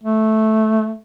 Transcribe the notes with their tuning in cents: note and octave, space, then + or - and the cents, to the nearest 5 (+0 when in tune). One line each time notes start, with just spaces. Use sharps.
A3 -10